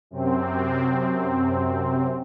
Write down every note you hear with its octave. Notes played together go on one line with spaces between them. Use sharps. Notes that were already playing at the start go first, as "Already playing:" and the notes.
F#2 C3 C4